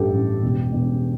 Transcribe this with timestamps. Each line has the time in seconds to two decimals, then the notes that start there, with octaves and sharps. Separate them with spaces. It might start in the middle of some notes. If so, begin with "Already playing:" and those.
Already playing: A1 G2 G4 A4
0.13 A1
0.43 E1
0.73 E1